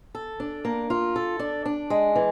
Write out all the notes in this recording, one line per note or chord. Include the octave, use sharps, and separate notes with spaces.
A4
D4
A#3
F4
A4
D4
D4
G#3
E3